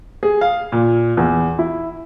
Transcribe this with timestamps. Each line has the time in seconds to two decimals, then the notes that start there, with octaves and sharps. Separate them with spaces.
0.23 G#4
0.41 F5
0.72 A#2
1.17 E2
1.59 E4